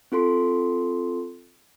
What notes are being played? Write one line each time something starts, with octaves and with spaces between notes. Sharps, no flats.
C4 F4 A4 C6